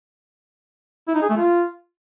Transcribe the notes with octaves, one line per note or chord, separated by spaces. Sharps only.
E4
D#4
G#4
A3
F4